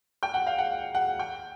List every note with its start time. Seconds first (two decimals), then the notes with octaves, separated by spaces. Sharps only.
0.23 G5
0.34 F#5
0.47 F5
0.59 F#5
0.95 F#5
1.19 G5